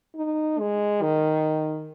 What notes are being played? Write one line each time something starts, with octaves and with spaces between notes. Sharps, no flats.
D#4
G#3
D#3